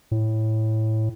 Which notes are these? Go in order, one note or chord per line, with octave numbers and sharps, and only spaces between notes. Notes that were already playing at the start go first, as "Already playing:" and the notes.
A2